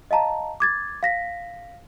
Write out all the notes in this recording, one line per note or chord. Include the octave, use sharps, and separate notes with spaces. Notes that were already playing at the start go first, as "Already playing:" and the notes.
D#5 F5 A5 A#5
D6 G#6 A6
F5 A#6 B6